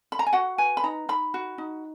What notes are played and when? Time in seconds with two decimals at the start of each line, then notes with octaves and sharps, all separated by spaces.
0.12 B5
0.19 A#5
0.27 G#5
0.33 F#4 F#5
0.58 B4 G#5
0.77 B5
0.83 D#4 A#5
1.09 D#4 B5
1.34 F#4
1.58 D#4